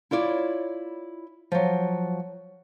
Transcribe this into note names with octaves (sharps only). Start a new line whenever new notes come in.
E4 F4 C#5 D5
F3 F#3